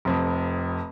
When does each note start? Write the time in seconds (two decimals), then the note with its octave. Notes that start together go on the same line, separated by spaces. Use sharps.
0.05 F1 F2